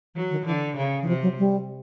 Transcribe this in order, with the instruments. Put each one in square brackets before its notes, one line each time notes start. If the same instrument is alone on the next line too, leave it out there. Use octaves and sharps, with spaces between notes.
[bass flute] E3 [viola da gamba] F#3
[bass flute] D#3
[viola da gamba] D3 [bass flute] E3
[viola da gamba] C#3
[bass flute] E3
[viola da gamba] C3 [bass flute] F3
[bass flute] F#3
G3